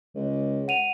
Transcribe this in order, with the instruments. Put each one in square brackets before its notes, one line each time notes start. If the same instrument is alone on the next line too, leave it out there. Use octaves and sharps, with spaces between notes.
[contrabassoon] C#2
[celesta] F#5 D#7 F7